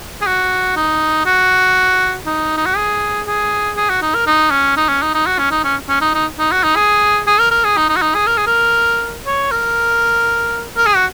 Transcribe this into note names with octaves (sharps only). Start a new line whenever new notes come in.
G#4
F#4
D#4
F#4
D#4
D#4
F#4
G#4
G#4
G#4
F#4
D#4
A#4
D#4
C#4
D#4
C#4
D#4
D#4
F#4
C#4
D#4
C#4
C#4
D#4
D#4
D#4
F#4
D#4
G#4
G#4
A#4
A#4
G#4
D#4
D#4
F#4
D#4
G#4
A#4
G#4
A#4
C#5
A#4
A#4
G#4
F#4